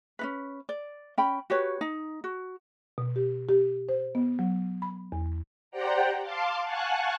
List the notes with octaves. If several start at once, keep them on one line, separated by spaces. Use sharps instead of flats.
C#4 D#4 B4
D5
C#4 G5 B5
F#4 G4 B4 C#5
D#4
F#4
B2
G4
G4
C5
B3
F#3
B5
E2
G4 C5 D5 F#5 G5 A#5
F5 A5 C6 D6
F5 F#5 G#5 A5 C#6 F#6